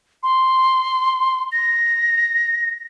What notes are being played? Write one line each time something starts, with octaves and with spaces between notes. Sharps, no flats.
C6
A#6